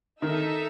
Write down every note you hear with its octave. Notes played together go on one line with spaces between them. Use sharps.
D#3 D#4 A4 E5